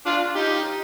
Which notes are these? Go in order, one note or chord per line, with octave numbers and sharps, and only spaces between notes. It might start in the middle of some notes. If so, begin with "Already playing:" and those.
D4 F4
D#4 G4